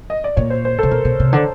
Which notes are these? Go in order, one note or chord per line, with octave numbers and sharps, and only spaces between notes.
D#5
D5
A#2 C#5
C5
C5
C3 A4
B2 A#4
B2
C3
D3